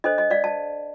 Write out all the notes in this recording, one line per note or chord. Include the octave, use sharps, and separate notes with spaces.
D4 A4 C5 D#5
D#5
D5 F5
A5